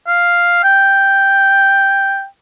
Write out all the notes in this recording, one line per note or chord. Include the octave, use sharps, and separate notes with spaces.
F5
G5